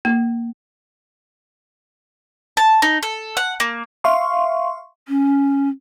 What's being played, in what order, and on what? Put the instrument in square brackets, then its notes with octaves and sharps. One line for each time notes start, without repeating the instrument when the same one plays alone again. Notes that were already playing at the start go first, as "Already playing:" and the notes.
[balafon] A#3
[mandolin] A5
D#4
A4
F#5
A#3
[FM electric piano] E5 F5 C6 C#6
[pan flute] C#4